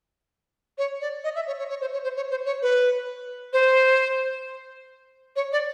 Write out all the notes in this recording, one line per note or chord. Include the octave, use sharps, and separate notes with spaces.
C#5
D5
D#5
E5
C#5
C#5
C#5
C5
C#5
C5
C#5
C5
C#5
B4
C5
C#5
D5